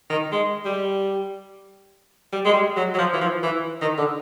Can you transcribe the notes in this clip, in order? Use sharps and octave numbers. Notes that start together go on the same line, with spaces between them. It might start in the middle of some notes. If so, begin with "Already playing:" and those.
D#3
G#3
G3
G3
G#3
G3
F#3
F#3
F3
E3
F3
E3
D#3
D3